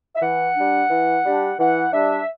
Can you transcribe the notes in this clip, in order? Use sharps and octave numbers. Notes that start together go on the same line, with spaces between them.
E5
E3 F#5
G3 D4
E3
G3 D4
E3 F#5
G3 D4 E5